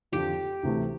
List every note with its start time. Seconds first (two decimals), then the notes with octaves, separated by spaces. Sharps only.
0.12 F2 D3 F3 C4 G4
0.63 D2 C3 E3 A3